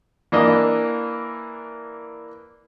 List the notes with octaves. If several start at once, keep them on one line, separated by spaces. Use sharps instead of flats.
E3 A#3 D4 D#5